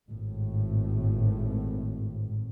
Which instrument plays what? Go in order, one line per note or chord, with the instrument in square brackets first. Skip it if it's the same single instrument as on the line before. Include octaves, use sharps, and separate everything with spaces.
[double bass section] G#1 A2